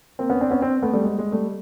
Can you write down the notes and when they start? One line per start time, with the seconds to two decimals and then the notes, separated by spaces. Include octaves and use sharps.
0.19 A#3 C4
0.29 B3 C#4
0.41 C4 D4
0.51 B3 C#4
0.62 C4 D4
0.83 A3 B3
0.93 G3 A3
1.04 G#3
1.18 G#3
1.32 G3 A3